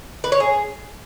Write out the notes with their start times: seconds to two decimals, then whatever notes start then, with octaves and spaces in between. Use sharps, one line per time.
0.24 B4
0.32 C#5
0.40 G#4